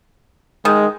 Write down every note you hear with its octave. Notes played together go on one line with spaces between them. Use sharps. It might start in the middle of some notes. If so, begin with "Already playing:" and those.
D#3 G#3